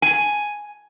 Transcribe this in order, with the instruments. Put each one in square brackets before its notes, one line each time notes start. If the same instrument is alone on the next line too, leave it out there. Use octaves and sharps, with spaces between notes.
[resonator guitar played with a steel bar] G#5